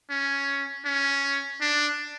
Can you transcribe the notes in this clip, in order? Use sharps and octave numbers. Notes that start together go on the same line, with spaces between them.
C#4
C#4
D4